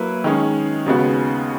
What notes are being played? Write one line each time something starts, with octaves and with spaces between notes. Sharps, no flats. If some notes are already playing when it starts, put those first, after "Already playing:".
Already playing: F#3 A#3 E4 B4
D#3 G#3 C#4
D#2 C#3 G#3 B3 F#4